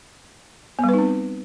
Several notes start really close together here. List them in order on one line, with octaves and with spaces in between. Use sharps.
B3 G3 B4 D#4 C4